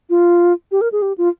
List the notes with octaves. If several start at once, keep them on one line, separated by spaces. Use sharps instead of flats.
F4
G4
A#4
G#4
G4
F4